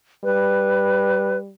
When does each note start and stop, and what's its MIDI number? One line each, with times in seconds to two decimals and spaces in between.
0.24 1.52 55
0.24 1.38 71